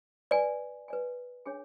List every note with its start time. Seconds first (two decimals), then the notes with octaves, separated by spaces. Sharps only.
0.31 B4 D5 G#5
0.88 B4 D5 G#5
1.46 D4 G#4 C#5 G#5